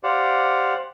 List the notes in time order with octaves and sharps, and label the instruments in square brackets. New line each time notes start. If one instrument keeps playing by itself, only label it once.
[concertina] G4 C5 D5 F5 F#5